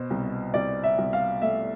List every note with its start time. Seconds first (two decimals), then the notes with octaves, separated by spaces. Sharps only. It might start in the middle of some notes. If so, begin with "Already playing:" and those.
Already playing: B2 C5
0.10 C2
0.54 C2 D5
0.84 E5
0.98 C2
1.13 F5
1.42 A3 E5